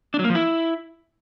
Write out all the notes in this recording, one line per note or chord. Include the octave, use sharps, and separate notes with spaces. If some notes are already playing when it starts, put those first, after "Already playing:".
D4
F#3
A#3
F3
E4